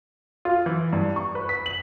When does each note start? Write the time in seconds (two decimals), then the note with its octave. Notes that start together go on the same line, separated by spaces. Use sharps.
0.45 F4
0.66 E3
0.93 G2
1.16 C#6
1.35 B4
1.49 B6
1.66 F#7